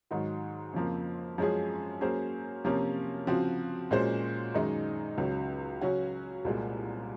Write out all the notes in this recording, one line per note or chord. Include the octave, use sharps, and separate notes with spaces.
G#2 D#3 F#3
F2 C#3 F3 A#3
F#2 F3 G#3 C#4 G#4
F#3 A#3 C#4 G#4 C5
C3 F3 A#3 C#4 F4
C#3 F3 C4 F#4
A#2 G#3 C#4 F#4 C5
F#2 D#3 G#3 D#4
C#2 C#3 F#3
C#3 F#3 C#4 F#4
C2 A#2 G#3